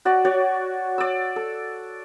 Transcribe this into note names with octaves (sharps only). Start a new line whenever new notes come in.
F#4 D5
F#4 C#5 D5
D5 E6
A4